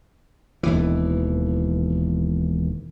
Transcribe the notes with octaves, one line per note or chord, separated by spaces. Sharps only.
E1 D#2 E3